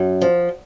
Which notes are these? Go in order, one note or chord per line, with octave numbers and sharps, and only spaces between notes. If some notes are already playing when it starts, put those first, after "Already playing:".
Already playing: F#2
F3